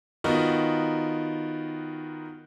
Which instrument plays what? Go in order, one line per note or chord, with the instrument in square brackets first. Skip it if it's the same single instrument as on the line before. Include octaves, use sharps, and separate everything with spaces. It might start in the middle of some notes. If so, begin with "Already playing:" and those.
[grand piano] D#3 B3 D#4 F4 F#4